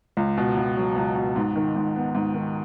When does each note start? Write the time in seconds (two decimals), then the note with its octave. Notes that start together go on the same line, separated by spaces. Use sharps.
0.17 C#2
0.37 B2
0.57 C#2
0.77 F#3
0.96 C#2
1.16 B2
1.36 G#2
1.56 D#3
1.76 G#2
1.96 B3
2.15 G#2
2.34 D#3